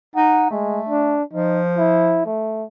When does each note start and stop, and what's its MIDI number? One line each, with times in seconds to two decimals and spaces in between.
0.16 0.51 63
0.16 0.47 78
0.51 0.80 56
0.51 1.16 57
0.89 1.23 62
1.33 2.26 53
1.33 1.61 63
1.77 2.21 64
2.26 2.65 57